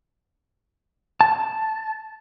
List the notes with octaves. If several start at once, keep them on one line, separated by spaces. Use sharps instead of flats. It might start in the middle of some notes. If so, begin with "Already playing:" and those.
A5